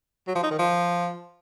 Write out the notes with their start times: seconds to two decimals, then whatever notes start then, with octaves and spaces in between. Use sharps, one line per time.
0.27 F#3
0.35 F3
0.43 D#4
0.51 D#3
0.59 F3